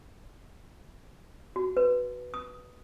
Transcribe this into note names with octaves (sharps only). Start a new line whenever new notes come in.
F#4
B4
D#6